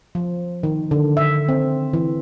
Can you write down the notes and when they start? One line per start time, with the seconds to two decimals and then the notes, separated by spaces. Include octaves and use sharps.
0.15 F3
0.63 D#3
0.91 D3
1.17 E5
1.49 C4
1.93 E3